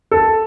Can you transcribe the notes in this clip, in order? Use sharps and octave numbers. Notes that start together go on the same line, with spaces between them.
A4